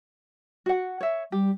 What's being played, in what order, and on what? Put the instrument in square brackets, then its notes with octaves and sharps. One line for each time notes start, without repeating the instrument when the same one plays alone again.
[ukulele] F#4 F#5
C#5 E5
[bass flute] G3 [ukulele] G4